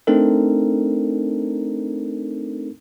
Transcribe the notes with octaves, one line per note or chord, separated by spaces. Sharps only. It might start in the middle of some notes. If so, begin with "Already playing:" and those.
A3 C4 D4 D#4 A4 A#4